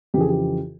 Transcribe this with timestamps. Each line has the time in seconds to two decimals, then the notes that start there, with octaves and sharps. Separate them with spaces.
0.14 F2 C#3 E3 G4
0.21 G#4
0.29 G4